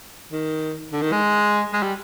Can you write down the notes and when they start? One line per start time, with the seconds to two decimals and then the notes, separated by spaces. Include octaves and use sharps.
0.32 D#3
0.93 D3
1.02 D#3
1.12 G#3
1.73 G#3
1.83 G3